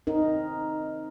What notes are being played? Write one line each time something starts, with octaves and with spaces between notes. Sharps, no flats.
C4 D#4 A#4